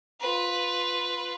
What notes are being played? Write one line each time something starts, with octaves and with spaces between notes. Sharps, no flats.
F4 B4